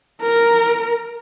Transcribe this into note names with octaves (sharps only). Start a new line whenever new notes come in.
A#4